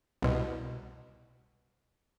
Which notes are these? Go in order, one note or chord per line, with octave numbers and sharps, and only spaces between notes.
C2 B2